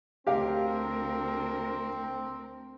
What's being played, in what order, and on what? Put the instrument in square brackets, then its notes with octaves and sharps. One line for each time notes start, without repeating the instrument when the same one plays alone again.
[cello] D2 A#4 [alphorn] C4 [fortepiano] G4 F5